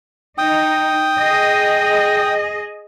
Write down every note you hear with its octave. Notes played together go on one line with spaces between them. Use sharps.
D#4 G5 D#6
G#4 D#5